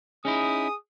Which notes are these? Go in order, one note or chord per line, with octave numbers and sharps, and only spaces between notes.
C#4 D#4 E4 G#4 D#6